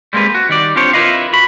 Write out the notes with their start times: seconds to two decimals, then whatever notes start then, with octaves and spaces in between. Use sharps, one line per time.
0.13 G3 G#3 A#3 C4 B4
0.35 F#4
0.49 D#3 G3 D5
0.76 C4 D4 F4 G4 C5 C#5
0.93 E4 F4 A#4 B4 D#5 F5
1.33 F#4 B5